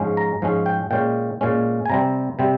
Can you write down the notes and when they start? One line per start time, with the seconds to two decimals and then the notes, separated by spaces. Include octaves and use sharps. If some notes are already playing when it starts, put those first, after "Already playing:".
Already playing: G#2 F3 G#3 C#4
0.17 A#5
0.42 G#2 F3 G#3 C#4
0.66 G5
0.91 A#2 G#3 C#4 G5
1.41 A#2 G#3 C#4
1.86 G#5
1.90 C3 G3 C4 A#5
2.39 C3 G3 C4